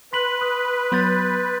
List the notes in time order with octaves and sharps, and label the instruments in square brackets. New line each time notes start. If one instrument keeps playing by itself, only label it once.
[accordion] B4 [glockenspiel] C6 B6 F#7
[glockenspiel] D#6
[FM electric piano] F#3 B3 [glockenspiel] C6 G6 A6